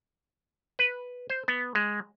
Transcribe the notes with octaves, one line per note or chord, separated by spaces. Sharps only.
B4
C5
B3
G#3